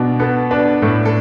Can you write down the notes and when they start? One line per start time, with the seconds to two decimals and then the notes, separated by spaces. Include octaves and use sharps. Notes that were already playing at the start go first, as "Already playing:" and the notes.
Already playing: B2 D4
0.20 B3 A4
0.51 D4 B4
0.82 A2 A4
1.05 A4